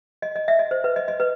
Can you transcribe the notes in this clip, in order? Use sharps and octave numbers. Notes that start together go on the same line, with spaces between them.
D#5
D#5
E5
D#5
C5
B4
D#5
D#5
B4